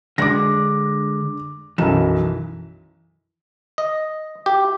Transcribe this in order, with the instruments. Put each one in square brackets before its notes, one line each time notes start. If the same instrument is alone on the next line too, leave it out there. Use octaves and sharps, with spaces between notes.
[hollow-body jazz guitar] D3 G#3 D4 [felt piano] D6 A#6
[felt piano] B1 F#2 E7 [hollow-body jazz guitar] E3
[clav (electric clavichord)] D#5
G4